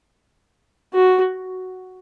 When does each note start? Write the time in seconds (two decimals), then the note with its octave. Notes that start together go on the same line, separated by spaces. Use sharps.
0.93 F#4